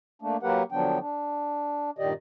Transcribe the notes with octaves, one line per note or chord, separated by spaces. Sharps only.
A3 A#3 D4
F#3 A#3 G4 A#4 B4 F#5
D3 F3 F#3 B3 D4 G5
D4
G2 A#2 D#3 G4 D5 D#5